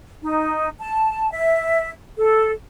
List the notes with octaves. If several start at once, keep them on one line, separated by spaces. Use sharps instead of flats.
D#4
A5
E5
A4